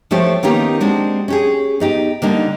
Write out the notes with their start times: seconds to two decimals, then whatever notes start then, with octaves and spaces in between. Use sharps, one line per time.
0.11 F3 A3 F#4 G4 C5 C#5
0.43 D#3 A#3 B3 C#4 D#4 G4
0.81 G#3 C4 D4 F#4
1.28 C#4 G4 G#4
1.80 B3 D#4 G4
2.22 D3 G3 A#3 D4 D#4